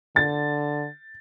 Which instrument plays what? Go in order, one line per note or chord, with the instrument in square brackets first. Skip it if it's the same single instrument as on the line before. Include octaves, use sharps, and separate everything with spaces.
[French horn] D3 [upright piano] A6